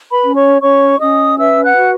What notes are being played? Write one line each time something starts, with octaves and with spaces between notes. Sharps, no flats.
B4 B5
C#4
C#5 C#6
C#4 C#5 C#6
C#4 D#5 D#6
B4 E5 E6
F#5 F#6
F#4